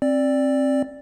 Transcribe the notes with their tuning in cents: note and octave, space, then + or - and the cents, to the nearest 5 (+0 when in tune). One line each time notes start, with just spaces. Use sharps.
C4 +25 D5 +0